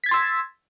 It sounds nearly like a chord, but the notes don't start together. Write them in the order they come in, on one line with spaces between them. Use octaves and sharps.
B6 G#6 A6 C6 E6